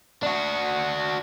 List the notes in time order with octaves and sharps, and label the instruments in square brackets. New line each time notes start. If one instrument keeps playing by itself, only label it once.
[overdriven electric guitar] D4 F#4